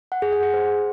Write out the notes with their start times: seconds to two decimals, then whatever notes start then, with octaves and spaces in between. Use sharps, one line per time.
0.12 F#5
0.22 G#4
0.33 F#5
0.43 G#4
0.54 C5